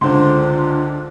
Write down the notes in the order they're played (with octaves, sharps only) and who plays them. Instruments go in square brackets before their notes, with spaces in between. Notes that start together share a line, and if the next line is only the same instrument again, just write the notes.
[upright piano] C#2 D3 [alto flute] D4 [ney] F4 [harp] C5 C6